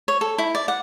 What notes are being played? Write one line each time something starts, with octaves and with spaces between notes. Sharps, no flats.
C#5
A4
E4
D5
F#5